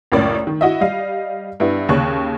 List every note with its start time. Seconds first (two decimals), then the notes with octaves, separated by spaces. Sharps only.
0.12 C#2 F#2 A2 A#4 C#5 D5
0.47 D#3
0.61 E4 F#4 D#5 E5
0.81 G3 D#5 F5
1.60 G2 B3 E4
1.89 D#2 C#3 C#5 C#6 F#6